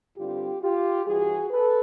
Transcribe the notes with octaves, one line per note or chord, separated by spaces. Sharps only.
G2 D3 G3 C4 F4 G4
F4 G4
G2 E3 G3 F#4 G#4
A4 B4